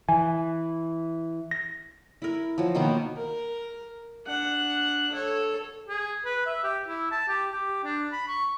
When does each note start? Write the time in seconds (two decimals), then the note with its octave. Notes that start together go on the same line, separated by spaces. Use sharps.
0.09 E3 G#5
1.51 A#6
2.22 E4 A#4
2.58 F3 F#3
2.75 B2 D#3 A#3 B3
3.17 A#4
4.26 D4 F#5
5.12 A4 C#5
5.88 G#4
6.25 B4
6.46 E5
6.64 G4
6.88 E4
7.11 A5
7.28 G4
7.52 G4
7.84 D4
8.12 B5
8.28 C#6